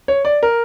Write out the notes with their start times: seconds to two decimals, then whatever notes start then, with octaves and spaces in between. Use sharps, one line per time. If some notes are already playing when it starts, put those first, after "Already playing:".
0.08 C#5
0.25 D5
0.43 A#4